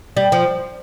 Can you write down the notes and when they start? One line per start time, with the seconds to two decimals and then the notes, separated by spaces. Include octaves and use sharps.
0.17 G3
0.32 F3